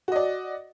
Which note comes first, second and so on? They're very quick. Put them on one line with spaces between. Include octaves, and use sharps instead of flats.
F#4 D#5 D5